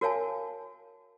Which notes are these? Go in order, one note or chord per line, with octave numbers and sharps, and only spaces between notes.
F#4 A#4 C#5 F5 G#5 A5